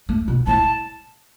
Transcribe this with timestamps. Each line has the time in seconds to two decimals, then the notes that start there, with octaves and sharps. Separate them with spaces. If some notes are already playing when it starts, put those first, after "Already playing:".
0.09 A3
0.28 B2
0.47 A2 A5